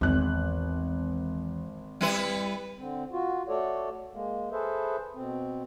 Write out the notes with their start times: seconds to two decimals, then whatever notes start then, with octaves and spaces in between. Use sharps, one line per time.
0.01 G#1 E2 F#6
2.01 G3 E4 B4
2.78 D3 C4
3.12 F4 F#4
3.48 A3 F#4 A4 C#5 D5
4.14 G#3 A#3
4.52 G#4 A4 B4 C5 E5
5.15 B2 C4